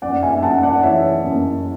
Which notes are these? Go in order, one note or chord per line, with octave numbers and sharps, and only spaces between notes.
F#2 D5 F#5
E5 G#5
F#2 F#5 A5
D5 F#5
E3 C#5 E5
F#2